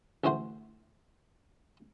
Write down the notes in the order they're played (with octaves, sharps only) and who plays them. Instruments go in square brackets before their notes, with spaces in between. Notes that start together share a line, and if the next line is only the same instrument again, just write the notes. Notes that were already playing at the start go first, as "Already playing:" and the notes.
[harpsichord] A1 D2 A3 F#4 C5